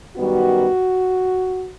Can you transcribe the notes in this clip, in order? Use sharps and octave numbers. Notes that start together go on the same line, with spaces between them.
F#2 D#3 G3 B3 F#4